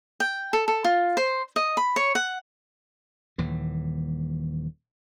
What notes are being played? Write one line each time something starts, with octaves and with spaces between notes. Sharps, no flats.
G5
A4
A4
F4
C5
D#5
B5
C#5
F#5
D#1 D#2 E3